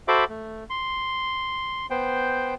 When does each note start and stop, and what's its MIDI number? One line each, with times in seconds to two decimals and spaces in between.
0.08 0.24 66
0.08 0.24 69
0.08 0.24 72
0.08 0.24 76
0.08 0.24 83
0.08 0.24 86
0.29 0.64 57
0.70 1.86 84
1.90 2.54 59
1.90 2.54 72
1.90 2.54 79